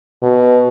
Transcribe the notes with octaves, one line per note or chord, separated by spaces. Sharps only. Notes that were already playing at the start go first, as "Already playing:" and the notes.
B2